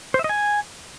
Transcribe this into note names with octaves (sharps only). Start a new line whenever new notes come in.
C5
E5
D#5
G#5